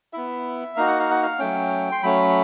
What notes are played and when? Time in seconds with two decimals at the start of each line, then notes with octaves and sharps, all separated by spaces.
0.13 B3 E4 E5
0.76 A#3 D#4 F#4 F5
0.88 F#5
0.99 F5
1.11 F#5
1.23 F5
1.39 F#3 A3 C#4 G5
1.92 C6
2.03 F#3 A3 C#4 B5